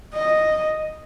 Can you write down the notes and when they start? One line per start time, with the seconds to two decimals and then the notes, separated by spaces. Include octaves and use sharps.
0.14 D#5